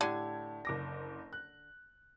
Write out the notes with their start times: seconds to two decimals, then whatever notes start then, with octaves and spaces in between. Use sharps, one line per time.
0.01 A2 D3 G4 G#6
0.65 F#1 D6 A#6
1.33 F#6